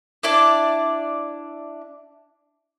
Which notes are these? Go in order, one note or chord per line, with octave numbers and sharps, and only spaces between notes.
D4 E4 D5